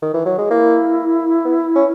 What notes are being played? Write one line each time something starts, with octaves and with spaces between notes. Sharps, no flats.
D#3
E3
F#3
G#3
A#3 E4
B3
C#4